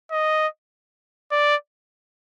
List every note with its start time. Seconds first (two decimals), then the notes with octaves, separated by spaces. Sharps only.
0.11 D#5
1.32 D5